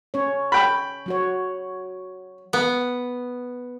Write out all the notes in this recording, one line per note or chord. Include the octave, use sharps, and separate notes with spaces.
C#4 C#5
G5 B5
F#3 F#4 C#5
B3